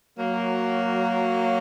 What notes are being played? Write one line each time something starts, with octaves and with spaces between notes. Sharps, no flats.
F#3 A#3